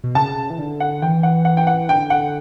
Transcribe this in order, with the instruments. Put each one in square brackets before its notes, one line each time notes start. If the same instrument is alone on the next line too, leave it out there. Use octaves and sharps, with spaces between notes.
[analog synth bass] B2
[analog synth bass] C#3 [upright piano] A5
[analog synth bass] E3
D3
[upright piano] F#5
[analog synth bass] E3 [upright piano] G5
[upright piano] F#5
F#5
G5
F#5
[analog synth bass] D3 [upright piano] G5
[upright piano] F#5